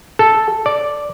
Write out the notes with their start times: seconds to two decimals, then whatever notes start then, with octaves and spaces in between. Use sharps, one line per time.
0.19 A4
0.66 D5